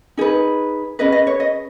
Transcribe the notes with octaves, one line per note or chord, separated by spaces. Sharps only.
D#4 G#4 B4
C#4 G#4 B4 D#5
D#5
C#5
D#5